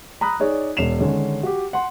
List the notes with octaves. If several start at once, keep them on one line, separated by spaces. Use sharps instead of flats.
A#5 B5 D#6 F#6
D#4 G#4 C#5 D5
E1 C#5 C7 E7 F7
D3 D#3 G#3 C#4
F#4 G4
F#5 C6